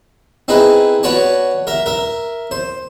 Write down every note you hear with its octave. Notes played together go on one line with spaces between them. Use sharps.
C4 D#4 E4 G#4 B4
F#4 B4 C#5 D5 A5
A#4 E5
A#4 E5
C5